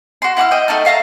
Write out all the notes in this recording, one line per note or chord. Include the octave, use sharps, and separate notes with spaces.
F#4 C6
E4 F#5 D6 F6
D#5 G5
A3 D#4 A5 F6
E5 F5 A5 A#5